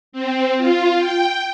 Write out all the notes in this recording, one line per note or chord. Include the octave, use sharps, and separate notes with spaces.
C4
F4
G5